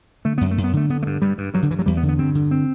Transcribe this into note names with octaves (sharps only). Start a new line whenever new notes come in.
D3 A3
F#2 B3
A3
F#2
B3
D3 A3
D3 B3
A3
G2
G2 G3
G2
G2 F#3
D3
G2 E3
F#3
E2 G3
B3
D3
B3
G2 C4
D3
C4